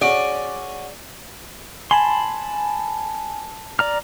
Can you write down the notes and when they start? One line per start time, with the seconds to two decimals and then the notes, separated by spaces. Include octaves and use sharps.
0.01 C#4 F#4 G#4 D5
1.91 G#5 A5 B5 C6
3.79 D5 A#5 F6